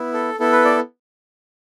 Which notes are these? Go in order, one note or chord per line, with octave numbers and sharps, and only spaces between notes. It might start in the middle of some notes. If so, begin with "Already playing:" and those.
Already playing: B3 E4
A4
B3 E4 A4
B4
D5